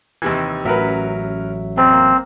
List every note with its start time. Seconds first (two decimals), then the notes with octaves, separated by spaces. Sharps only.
0.22 D#2 C3 E3
0.65 A1 F#3 C#4 A#4 B4 E5
1.77 F2 C4
1.92 A#3